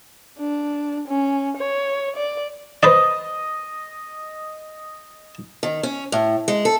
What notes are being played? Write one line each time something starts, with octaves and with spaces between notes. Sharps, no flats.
D4
C#4
C#5
D5
B4 C5 D5 D#5
D#3
C#4
A2
G#3
A4